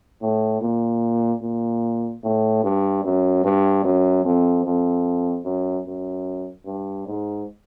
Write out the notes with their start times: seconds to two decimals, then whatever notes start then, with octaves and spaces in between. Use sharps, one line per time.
0.22 A2
0.61 A#2
1.42 A#2
2.23 A2
2.63 G2
3.04 F#2
3.44 G2
3.84 F#2
4.25 F2
4.65 F2
5.45 F#2
5.86 F#2
6.66 G2
7.06 G#2